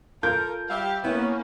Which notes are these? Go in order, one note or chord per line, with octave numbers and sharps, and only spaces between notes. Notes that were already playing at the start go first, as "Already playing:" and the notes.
F4 A4 A#4 G6
G3 G4 E5 F5
A#3 B3 C#4 E4